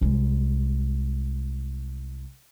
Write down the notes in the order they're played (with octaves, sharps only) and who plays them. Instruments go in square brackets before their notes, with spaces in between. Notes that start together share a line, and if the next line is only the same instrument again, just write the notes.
[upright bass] C2 G#3